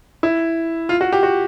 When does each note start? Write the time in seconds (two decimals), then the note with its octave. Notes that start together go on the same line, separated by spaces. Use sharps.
0.23 E4
0.89 F4
1.01 F#4
1.12 G4
1.23 F#4